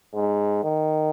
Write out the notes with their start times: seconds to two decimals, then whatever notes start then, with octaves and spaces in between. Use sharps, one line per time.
0.15 G#2
0.64 D#3